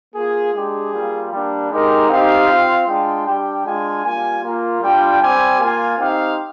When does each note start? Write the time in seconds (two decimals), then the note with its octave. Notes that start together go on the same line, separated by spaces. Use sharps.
0.15 A#3 F4 G#4
0.54 G#3 D4 G4 G#4
0.94 G3 A#3 F4
1.32 G3 A#3 D4
1.71 G#3 D#4 G4 A#4
2.10 C4 D#4 G4 F5
2.48 C4 F4
2.87 G#3 D4 F4 G5
3.26 G3 D4 G4 G5
3.65 G#3 D4 F4 G#5
4.03 G3 A#3 F4 G#5
4.43 A#3 F4
4.82 G3 D4 F4 G5
5.20 G3 C4 G4 G#5
5.59 A#3 F4 G#5
5.98 C4 D#4 G4 F5